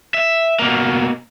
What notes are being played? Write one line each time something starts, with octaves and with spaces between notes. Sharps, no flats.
E5
B2 A#3